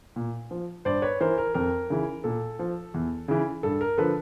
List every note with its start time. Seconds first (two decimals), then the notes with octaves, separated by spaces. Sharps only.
0.16 A#2
0.51 F3
0.85 G2 C5 D5
1.02 B4 C#5
1.20 E3 A#4 C5
1.38 A#4
1.54 F2 A#4
1.90 C#3 E3
2.24 A#2 A4
2.59 F3
2.94 E2
3.28 C#3 E3
3.63 G2 A4
3.81 A#4
3.97 D3 F3 A4 B4